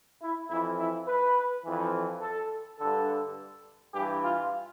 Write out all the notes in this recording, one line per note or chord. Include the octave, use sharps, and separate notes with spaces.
E4
F2 E3 E4
E4
B4
F2 E3
A4
G2 D3 A4
G2 E3 G4
F4